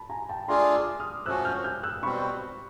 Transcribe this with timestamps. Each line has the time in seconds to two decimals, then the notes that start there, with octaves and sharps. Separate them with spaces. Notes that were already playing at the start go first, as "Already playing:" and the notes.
Already playing: A5 B5
0.10 G#5 A#5
0.29 G5 A5
0.48 A3 D4 F4 G#4 A#5 C6
0.74 D6 E6
1.00 D#6 F6
1.25 F3 A3 C#4 F#4 E6 F#6
1.45 F6 G6
1.64 F6 G6
1.83 E6 F#6
2.03 B2 G3 C4 B5 C#6